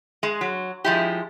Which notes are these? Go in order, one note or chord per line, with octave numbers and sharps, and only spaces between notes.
G#3
F#3
F3 G#3 E4 G4